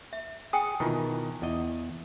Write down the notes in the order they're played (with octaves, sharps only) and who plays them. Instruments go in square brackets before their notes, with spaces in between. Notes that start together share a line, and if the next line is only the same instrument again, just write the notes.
[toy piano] E5
[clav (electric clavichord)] G#4 [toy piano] G5 G#5 D#6
[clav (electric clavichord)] B2 D#3 E3 [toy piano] E4 F4
[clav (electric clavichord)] E2 D#5